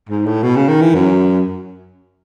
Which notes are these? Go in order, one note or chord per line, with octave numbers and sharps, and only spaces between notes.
G#2
A2
B2
C#3
D#3
E3
F#2